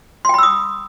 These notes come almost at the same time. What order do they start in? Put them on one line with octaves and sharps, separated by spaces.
C6 G5 B5 E6 D#6